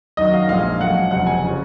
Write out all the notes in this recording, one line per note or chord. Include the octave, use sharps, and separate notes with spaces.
F#2 D#3 F#3 D#5
F5
A#1 A#2 G#3 F5
F#2 F3 G#3 F#5
F#1 F2 C3 F#5
G#5
C#3 F3